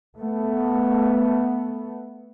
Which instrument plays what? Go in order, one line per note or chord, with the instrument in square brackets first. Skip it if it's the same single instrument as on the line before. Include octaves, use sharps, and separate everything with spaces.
[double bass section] A3 B3